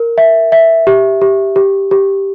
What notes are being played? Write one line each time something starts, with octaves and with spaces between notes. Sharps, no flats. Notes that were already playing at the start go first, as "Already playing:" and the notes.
Already playing: A#4
E5
E5
G4
G4
G4
G4